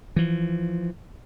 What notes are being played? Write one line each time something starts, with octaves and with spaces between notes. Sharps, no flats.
E3 F3